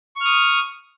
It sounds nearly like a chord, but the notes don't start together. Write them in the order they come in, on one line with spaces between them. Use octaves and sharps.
C#6 F6 D#6